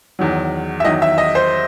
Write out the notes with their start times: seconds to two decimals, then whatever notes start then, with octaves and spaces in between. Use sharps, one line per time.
0.19 E2 D#3 F#3
0.80 E5
0.85 E2 D#3 F#3 D#5
1.02 E5
1.18 D#5
1.35 C5